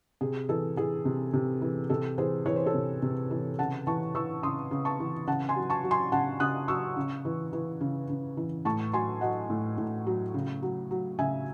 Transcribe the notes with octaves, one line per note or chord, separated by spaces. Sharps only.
C3 G#4
E3 A4
E3 G#4
C3
C3
E3
C3 A4
E3 G#4 C5
E3 C#5
C5
A4 C#5
C3
C3
E3
C#3 F#5 A5
E3 A5 C#6
E3 C#6 E6
C#3 C6 D#6
C#3
A5 C#6
E3
C#3 F#5 A5
G#5 C6
F#3
A5 C#6
F#3
G#5 C6
C#3 F#5 A5
C#3 D#6 F#6
F#3 C#6 E6
C#3
E3
E3
C#3
C#3
E3
A2 A5 C#6
F#3 G#5 C6
F#3 D#5 F#5
A2
A2
F#3
C#3
F#3
F#3
C#3 E5 G#5